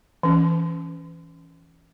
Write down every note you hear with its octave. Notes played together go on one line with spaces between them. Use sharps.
E3 C#4